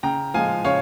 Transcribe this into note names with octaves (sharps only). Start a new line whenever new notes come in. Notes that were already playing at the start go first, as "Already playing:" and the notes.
C#3 G5 A#5
F3 G#3 F5 G#5
C#3 C#5 F5